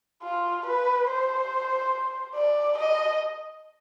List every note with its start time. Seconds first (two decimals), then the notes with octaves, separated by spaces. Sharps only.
0.23 F4
0.66 B4
1.08 C5
2.35 D5
2.78 D#5